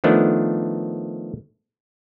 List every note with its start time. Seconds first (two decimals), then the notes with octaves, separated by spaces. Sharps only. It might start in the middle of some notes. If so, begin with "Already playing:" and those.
0.04 D#3 F3 A3 B3 D4